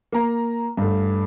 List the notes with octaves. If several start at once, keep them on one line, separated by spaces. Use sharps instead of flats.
A#3 A#5
G2 A3